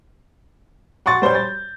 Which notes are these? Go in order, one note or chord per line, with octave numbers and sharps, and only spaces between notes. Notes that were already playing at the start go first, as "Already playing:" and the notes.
F#5 C6 C#6 A6
G3 C5 C#5 G6
A6